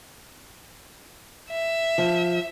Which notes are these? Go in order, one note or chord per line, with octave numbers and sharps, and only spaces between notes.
E5
F3